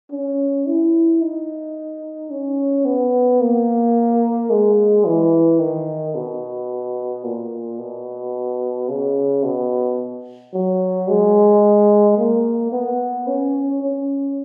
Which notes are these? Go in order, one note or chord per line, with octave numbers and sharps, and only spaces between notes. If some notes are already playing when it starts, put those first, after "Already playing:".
C#4
E4
D#4
C#4
B3
A#3
G#3
E3
D#3
B2
A#2
B2
C#3
B2
F#3
G#3
A#3
B3
C#4
C#4